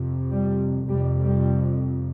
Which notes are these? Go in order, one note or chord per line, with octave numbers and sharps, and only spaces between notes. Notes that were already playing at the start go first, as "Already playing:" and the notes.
Already playing: F2 C3
G3
F2 C3 G3
G3